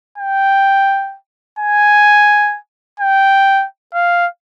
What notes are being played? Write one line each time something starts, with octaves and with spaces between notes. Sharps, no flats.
G5
G#5
G5
F5